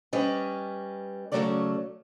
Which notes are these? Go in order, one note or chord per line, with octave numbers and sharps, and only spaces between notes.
G3 C#4 B4 D#5
C#3 F3 F#3 A3 C#4 D5